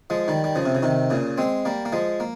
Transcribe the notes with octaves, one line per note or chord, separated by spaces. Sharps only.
F3 G#3
D#3 G3
G3
C#3 F3
C3
C#3
C3 D#3
A#2 C#3
G#3 C4
G3 A#3
A#3
F3 G#3
A#3